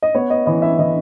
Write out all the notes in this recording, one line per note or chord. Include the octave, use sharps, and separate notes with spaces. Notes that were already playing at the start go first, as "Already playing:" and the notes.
D#5
B3 C#5
D#5
E3 D#5
E5
E3 D#5